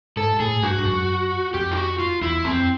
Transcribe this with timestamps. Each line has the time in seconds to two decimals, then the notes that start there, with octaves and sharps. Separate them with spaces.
0.17 G#2 A4
0.40 A2 G#4
0.63 G2 F#4
0.78 G2
0.85 F#2
1.54 F2 G4
1.71 F4
1.76 F#4
1.99 F4
2.22 E2 E4
2.45 F2 C4